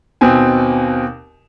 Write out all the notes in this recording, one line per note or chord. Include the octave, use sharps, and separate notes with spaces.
D#2 B2 C4 G#5